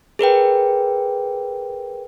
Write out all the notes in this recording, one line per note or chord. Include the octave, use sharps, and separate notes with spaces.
G#4 A#4 B4 G5